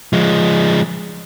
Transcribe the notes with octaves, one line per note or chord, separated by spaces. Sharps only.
F3 G#3